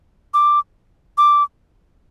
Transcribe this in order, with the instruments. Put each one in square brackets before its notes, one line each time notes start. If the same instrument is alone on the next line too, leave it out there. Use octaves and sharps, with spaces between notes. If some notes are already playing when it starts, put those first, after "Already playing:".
[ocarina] D6
D6